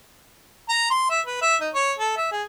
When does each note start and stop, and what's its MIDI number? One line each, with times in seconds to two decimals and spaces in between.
0.69 0.87 82
0.90 1.09 84
1.10 1.21 76
1.26 1.39 71
1.42 1.56 76
1.61 1.69 63
1.74 1.93 73
1.98 2.13 69
2.17 2.30 76
2.32 2.43 68